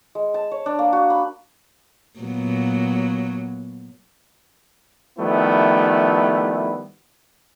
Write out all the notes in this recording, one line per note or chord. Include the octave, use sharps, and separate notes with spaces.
G#3
A5
C#5
D4
A#3
F#4
B5
A#2 F#3 B3
D#3 F3 G3 A3 B3 E4